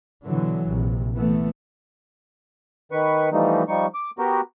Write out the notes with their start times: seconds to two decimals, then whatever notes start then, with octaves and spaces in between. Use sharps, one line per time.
0.25 B2 D3 E3 F#3
0.66 A#1 C3
1.14 E3 A3 B3
2.92 D#3 B4 C#6
3.32 E3 F3 G3 A3 D#4
3.68 F3 G3 D#4 C#6
3.94 D6
4.19 B3 F#4 G4 A#4